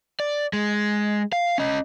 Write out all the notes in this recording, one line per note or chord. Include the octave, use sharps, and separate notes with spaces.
D5
G#3
F5
C#4 D#5